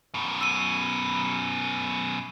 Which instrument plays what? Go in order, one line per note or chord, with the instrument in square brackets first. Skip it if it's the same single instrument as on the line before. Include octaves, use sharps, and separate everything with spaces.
[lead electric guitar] F#2 B2
[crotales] E6 D#7